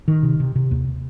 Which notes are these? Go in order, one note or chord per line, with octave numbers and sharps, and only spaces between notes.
D#3
C3
C3
C3
D#2